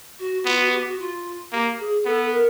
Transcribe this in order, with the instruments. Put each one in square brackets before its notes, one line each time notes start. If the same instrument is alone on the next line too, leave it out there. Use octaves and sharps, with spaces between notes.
[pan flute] F#4
[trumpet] B3 [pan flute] F4
[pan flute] F#4
G4
F#4
F4
[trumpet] A#3 [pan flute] G4
[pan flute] G#4
[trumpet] B3 [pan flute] A4
[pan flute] A#4